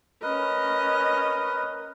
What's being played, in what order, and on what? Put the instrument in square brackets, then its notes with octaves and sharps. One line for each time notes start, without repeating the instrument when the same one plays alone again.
[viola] C#4 D#5 [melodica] A#4 B4